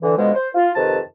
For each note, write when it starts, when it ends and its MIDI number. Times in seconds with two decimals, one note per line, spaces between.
0.01 0.16 50
0.01 0.16 52
0.17 0.35 47
0.17 0.35 50
0.17 0.35 53
0.17 0.35 56
0.35 0.49 72
0.55 0.69 65
0.75 0.98 41
0.75 0.98 48
0.75 0.98 51
0.75 0.98 71
0.75 0.98 81